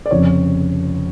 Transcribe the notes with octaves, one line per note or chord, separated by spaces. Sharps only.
D5
F1 F2 C#3 C#5